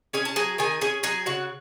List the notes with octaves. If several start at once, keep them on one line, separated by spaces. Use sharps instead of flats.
C#4 G#4 G#5
A5
F#3 G#4 G#5
D#3 G#4 G#5
C#4 G#4 G#5
F#3 G#4 G#5
C#3 F#4 F#5